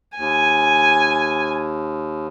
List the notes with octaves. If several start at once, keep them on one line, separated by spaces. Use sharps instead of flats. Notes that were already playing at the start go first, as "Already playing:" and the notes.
D#2 G#5